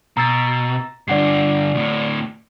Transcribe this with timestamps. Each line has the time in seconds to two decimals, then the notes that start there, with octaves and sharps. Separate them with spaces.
0.17 B2 A#5 E6 A6
1.08 G2 D3 D5 F#5 C7
1.75 D2 A2